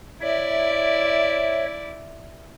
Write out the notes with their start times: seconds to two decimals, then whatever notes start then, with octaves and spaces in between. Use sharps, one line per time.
0.21 E4 C#5 D5 E5